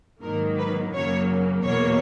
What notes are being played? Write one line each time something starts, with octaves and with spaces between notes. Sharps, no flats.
G#2 D#3 F#3 A#3 A#4
B4
F#2 C#3 F#3 A#3 C#5
E2 B2 F#3 A#3 C#5